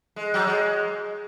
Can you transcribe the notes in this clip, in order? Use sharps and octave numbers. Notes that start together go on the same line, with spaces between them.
G#3
F#3
G#3